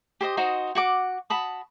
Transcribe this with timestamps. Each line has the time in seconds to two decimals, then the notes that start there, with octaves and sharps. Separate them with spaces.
0.21 G4 C5 D#5 D#6
0.37 D#4 F#4 C5 D#5
0.75 F#4 F#5 D6
1.30 F#4 A5 B5 D#6